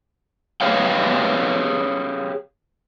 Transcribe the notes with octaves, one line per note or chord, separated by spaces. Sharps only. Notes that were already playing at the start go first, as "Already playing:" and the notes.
G4 G#4 B4 C#5 F5 G5